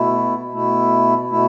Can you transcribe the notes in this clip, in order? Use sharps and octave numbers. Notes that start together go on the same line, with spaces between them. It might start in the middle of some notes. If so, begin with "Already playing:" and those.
Already playing: B2 A3 E4
B2 A3 E4
B2 A3 E4